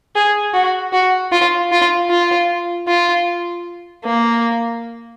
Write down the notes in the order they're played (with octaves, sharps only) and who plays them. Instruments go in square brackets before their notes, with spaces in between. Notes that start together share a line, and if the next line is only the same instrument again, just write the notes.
[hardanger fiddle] G#4
F#4
F#4
F4
F4
F4
F4
A#3